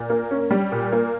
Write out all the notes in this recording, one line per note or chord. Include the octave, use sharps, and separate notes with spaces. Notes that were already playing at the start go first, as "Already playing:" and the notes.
Already playing: A#2
A#3
C#4
G3
A#2
A#3